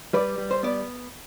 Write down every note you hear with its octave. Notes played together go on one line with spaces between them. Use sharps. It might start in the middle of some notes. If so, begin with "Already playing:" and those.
G3 B4 D5
G3
C5
B3 D5